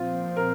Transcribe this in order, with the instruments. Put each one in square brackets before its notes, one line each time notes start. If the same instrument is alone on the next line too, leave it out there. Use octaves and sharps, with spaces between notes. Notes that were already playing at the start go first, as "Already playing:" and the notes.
Already playing: [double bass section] A#2 F3 C4 [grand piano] F4
[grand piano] A#4